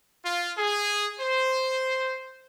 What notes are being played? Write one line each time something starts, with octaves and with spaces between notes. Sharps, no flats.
F4
G#4
C5